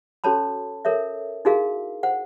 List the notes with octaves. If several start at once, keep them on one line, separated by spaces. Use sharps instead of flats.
C#4 F#4 A4 C#5 A5 B5
A4 A#4 C#5 E5
D#4 E4 F#4 G#4 A#4 F5
C5 F#5